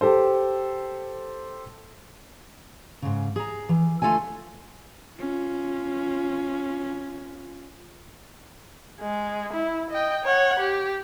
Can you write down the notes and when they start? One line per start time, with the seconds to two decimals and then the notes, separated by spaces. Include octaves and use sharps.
0.01 G4 A4 C5
3.02 G#2 C#3
3.36 G#4 A#5
3.69 E3
4.02 D2 A3 F4 A4 E5 G#5
5.19 C#4 F4
9.01 G#3
9.54 E4
9.91 D#5 G5
10.24 C#5 F#5
10.60 G4